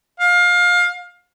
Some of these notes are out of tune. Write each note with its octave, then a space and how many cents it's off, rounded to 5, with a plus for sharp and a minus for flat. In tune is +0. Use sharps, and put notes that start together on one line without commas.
F5 +25